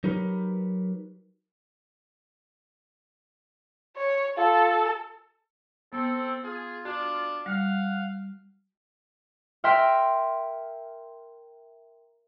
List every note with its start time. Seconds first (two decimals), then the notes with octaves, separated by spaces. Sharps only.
0.04 F#3 D#4 G4 A#4 B4
3.97 C#5
4.37 F4 A4
5.93 B3 C4 A4
6.44 F4 G#4
6.85 D4 F#4
7.46 G3 F5 F#5
9.64 A#4 E5 G5 C6